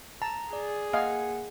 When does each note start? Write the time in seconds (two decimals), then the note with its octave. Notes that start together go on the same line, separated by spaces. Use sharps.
0.22 A5 A#5
0.53 G#4 D5
0.93 A#3 D#5 F5 F#5 G#5